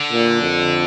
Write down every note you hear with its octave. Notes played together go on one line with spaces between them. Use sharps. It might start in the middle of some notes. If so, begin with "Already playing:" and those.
Already playing: D3
A#2
F2